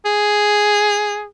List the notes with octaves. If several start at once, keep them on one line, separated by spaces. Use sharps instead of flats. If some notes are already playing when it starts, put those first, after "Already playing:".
G#4